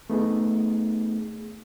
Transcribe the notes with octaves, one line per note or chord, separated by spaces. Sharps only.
A3 B3 D#4 G#4